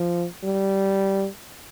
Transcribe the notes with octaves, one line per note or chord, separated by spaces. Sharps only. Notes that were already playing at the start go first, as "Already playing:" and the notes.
Already playing: F3
G3